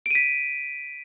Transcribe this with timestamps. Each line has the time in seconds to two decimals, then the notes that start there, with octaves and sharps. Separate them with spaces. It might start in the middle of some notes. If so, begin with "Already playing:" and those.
0.06 D7
0.11 D#7
0.15 B6